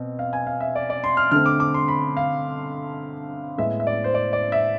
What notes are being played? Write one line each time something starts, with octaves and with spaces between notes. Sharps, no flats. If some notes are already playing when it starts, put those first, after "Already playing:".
Already playing: B2 C4
F5
G#5
F5
E5
D5
D5
C6
F6
D3 A3 C4 F6
D6
D6
C6
B5
F5
A2 G#3 B3 E5
E5
D5
C5
D5
D5
E5